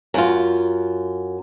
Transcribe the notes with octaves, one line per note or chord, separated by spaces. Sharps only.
F#2 F4